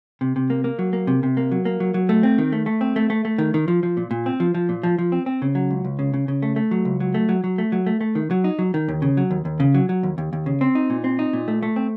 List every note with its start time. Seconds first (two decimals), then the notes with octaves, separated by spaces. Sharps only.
0.21 C3
0.36 C3
0.50 A#3
0.64 A#3
0.79 F#3
0.93 A#3
1.07 C3
1.23 C3
1.37 A#3
1.52 F#3
1.65 A#3
1.80 F#3
1.94 F#3
2.09 A3
2.23 C4
2.38 D#3
2.52 A3
2.66 A3
2.81 C4
2.96 A3
3.10 A3
3.25 A3
3.38 D#3
3.54 D#3
3.68 F3
3.83 F3
3.97 A#2
4.11 A#2
4.26 C4
4.40 F3
4.54 F3
4.69 A#2
4.83 F3
4.99 F3
5.12 C4
5.26 C4
5.42 C#3
5.55 F#3
5.71 C#2
5.84 C#2
5.99 C#3
6.14 C#3
6.28 C#3
6.42 A3
6.56 A3
6.71 F#3
6.85 C#2
7.00 F#3
7.14 A3
7.29 F#3
7.44 F#3
7.58 A3
7.72 F#3
7.87 A3
8.01 A3
8.15 D#3
8.31 F#3
8.44 D#4
8.59 F#3
8.74 D#3
8.88 D#2
9.02 C#3
9.17 F#3
9.31 D#2
9.45 D#2
9.60 C#3
9.74 F#3
9.89 F#3
10.03 D#2
10.18 D#2
10.33 D#2
10.46 C#3
10.61 C4
10.75 D#4
10.90 A#2
11.04 C4
11.19 D#4
11.33 A#2
11.48 A3
11.63 A3
11.76 C4